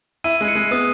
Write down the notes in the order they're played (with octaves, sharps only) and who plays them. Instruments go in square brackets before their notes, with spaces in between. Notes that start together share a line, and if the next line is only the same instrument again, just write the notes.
[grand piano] E4 [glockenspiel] D#7
[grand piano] G#3
[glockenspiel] C#7
[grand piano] G#3
[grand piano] B3 [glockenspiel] D#6